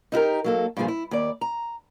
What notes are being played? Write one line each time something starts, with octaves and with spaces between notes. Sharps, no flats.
D#4 E4 G4 A#4
F#3 A#3 A4
G2 A#2 D3 F3 G#4
E4
D#2 D5
A#5